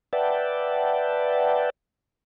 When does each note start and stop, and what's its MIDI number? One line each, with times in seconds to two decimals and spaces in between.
0.13 1.70 71
0.13 1.70 74
0.13 1.70 76
0.13 1.70 78
0.13 1.70 79
0.13 1.70 81